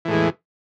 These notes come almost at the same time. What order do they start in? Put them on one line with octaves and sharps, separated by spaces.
E3 A2 G#3 E2